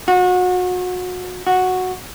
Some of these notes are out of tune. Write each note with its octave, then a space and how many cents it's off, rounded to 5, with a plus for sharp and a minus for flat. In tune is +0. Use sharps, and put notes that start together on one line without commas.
F#4 -30
F#4 -5